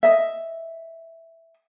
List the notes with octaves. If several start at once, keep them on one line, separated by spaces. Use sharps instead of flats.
D#5 E5